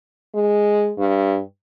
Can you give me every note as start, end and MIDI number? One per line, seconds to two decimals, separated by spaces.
0.34 0.92 56
0.98 1.40 43